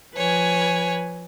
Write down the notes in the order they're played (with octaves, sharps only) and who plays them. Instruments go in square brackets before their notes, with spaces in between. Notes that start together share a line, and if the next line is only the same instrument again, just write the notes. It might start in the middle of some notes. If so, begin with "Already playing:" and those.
[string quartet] F3 B4 C#5 G#5